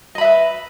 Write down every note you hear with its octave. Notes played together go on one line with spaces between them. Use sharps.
B4 D#5 E5 B5